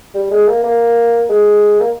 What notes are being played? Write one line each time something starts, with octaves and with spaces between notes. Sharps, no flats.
G3
G#3
A#3
A#3
G#3
A#3